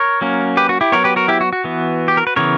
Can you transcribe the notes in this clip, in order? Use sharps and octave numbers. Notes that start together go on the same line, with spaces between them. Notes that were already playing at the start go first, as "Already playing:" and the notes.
Already playing: A#4 C#5
F#3 A#3 C#4
G4 B4
F#4
E4 G4
F#3 B3 A#4 C#5
G4 B4
F#4 A#4
E4 G4
F#4
F#4
E3 B3
G4
A#4
B4
C#3 E3 B3 A#4 C#5